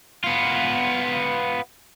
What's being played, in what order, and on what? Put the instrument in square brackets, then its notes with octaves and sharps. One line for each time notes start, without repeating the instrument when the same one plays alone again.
[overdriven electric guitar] B3 F4